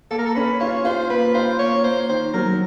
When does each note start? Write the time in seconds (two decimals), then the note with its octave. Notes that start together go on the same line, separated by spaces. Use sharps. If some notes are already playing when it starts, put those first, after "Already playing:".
0.11 A#3 A4
0.19 A#4
0.26 A4
0.35 C#4 B4
0.60 F4 C#5
0.85 F4 C5
1.10 A#3 B4
1.34 F4 C5
1.59 A#3 C#5
1.84 A#3 C5
2.09 D#3 C5
2.34 F#3 A#4